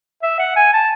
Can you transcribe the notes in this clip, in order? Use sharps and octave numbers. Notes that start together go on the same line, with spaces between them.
E5
F#5
G#5
A5